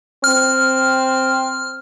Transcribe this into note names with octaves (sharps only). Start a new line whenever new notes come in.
C4 F6